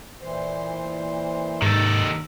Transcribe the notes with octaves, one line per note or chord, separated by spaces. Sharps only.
A#2 E3 C5
D#2 G#2 D#3 A4